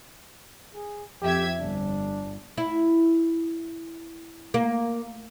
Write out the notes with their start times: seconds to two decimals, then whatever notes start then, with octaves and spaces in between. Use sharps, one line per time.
0.75 G#4
1.22 F2 G4 E5 G#6
1.60 G1 D4
2.57 E4
4.54 A#3